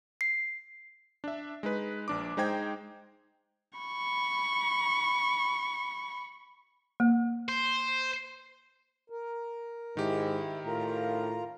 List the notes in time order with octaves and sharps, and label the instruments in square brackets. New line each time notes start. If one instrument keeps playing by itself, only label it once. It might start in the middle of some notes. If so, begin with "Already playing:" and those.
[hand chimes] C7
[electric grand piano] D4 E5
G#3 D#4 B4
A#1 D4 D6
G#3 D#4 C5 G5 G#6
[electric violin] B5 C#6
[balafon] A#3
[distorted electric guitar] C5
[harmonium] A#4
[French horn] G#2 [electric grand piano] D#3 G4 [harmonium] E4
[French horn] A2 [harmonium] F4 A#4 A#5